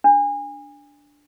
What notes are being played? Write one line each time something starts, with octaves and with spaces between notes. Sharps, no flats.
D4